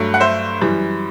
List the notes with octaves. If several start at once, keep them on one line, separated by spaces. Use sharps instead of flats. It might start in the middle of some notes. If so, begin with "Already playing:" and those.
Already playing: G2 F#3 A3
F#5
C5 E5
F#2 E3 G3